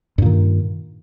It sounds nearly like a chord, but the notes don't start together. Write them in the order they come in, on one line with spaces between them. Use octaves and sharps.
G2 A#2 D#3